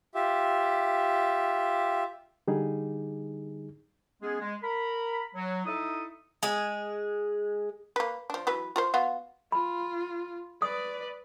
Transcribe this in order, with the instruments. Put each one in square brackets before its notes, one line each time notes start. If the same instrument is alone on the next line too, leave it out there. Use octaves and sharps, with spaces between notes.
[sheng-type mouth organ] F4 G4 E5
[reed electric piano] D3 G3 D#4 G#4
[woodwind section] G#3 B3 C#4 G#4
G#3
A#4 A#5 B5
F#3
D#4 E4 A4 E5 D#6
[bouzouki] G#3 G#4
[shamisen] A#3 B4
F3 D4
E3 F#3 B4
F4 A#4 C5
B3 F4 F#4
[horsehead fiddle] F4 [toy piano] B5
[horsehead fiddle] B4 D5 [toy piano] D#6